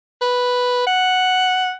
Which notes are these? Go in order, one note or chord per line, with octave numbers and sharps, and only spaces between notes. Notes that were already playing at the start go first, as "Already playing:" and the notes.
B4
F#5